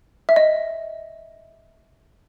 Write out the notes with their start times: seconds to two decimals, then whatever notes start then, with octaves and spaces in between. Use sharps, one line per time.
0.29 E5
0.36 D#5